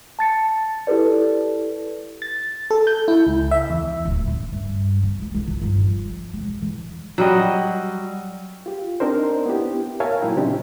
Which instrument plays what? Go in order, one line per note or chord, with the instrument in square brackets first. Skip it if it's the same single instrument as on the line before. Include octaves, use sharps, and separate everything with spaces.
[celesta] A5 A6 C#7
E4 G4 A4 B4 D5
[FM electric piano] A6
A4
G6
E4
C#2
E5
E2
[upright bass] D1
C#3
G2
C3
D2
C2
D#3
G1
F3
E1
E3
[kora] F#3 G3 D#5
[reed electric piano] F4 G4
C4 D4 D#4 A#4 C5
B3 E4 G4
A#4 C#5 E5 F5 G#5 A5
A#2 F#3 D#4 E4 G5
C#3 C4 D4 G4